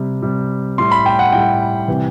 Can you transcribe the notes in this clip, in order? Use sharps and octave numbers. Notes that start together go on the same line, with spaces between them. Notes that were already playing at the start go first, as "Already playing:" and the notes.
Already playing: C3 G3
C3 G3
A2 G3 C6
B5
G5
F#5
A2 G3 G5
C3 E3 G3